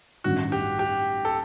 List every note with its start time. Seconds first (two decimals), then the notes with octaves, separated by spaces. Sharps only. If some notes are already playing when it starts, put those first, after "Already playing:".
0.24 A1 G2 D#3 F#4
0.52 G4
0.79 G4
1.25 A4